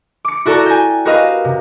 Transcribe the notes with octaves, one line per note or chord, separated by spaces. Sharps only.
D6 C#7
E4 F#4 A4 D5 A#5
G5 G#5
F#4 G4 A#4 B4 D#5 F5
C3